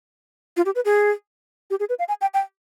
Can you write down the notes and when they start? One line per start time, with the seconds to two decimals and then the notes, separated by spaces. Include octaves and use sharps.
0.57 F4
0.66 G4
0.75 B4
0.85 G#4
1.70 G4
1.80 G#4
1.89 B4
1.99 F5
2.08 G#5
2.21 G5
2.34 G5